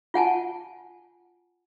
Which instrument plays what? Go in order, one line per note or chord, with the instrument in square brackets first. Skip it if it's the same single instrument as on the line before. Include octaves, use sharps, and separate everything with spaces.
[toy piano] F4 F#5 G#5 A5